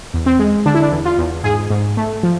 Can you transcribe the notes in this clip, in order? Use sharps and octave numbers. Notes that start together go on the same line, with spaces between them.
E2
C4
G#3
D3 D4
E4
D4
E2
F4
E2
G#2 G#4
G#2
A3
F3